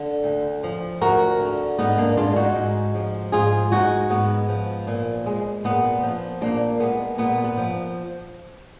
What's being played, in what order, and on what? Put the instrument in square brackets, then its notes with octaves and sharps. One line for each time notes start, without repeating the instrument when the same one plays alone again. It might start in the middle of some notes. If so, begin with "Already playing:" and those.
Already playing: [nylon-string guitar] D3
D2
F3
D2 F#4 A#4
D3
G#2 B3 D#4
A#3 D4
G#3 D4 F4
D#4 F#4
G#2
F3
G#2 F4 G#4
G#3 D#4 F#4
G#2 B3
F3
A#2
G#3
A#2 B3
F3
A#2 A#3 D4
G#3 B3
A#2 B3
B3
F3